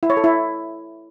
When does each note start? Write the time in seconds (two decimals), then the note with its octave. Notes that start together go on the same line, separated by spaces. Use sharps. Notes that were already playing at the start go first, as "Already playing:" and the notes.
0.03 E4
0.10 C#5
0.17 A4
0.24 E4